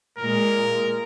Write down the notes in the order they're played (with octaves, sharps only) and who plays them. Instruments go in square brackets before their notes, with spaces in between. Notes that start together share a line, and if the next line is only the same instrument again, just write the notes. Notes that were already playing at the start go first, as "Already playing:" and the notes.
[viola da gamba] A#2 G#3 [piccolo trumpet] A#4